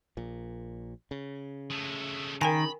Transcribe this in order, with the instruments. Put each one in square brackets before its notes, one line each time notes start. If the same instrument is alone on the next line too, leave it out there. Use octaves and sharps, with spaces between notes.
[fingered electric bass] A#1 A#2
C#3
[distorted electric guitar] G#3 A3
[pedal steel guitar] D#3 [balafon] A#4 G5 G#5 [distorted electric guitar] B5